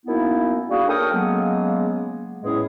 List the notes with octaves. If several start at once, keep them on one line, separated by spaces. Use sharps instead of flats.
F#2 A#3 B3 D#4 E4
G3 A#3 D4 F#4 G#4
A4 A#4 C#5 G5 D#6
C#3 F#3 G#3 A#3 B3
E2 A2 G#3 C#4 G#4